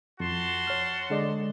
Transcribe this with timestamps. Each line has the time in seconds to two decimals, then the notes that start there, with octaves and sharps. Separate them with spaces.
0.20 F2 F#4 A5 C6
0.67 C#5 F6
1.10 D3 G#3 D5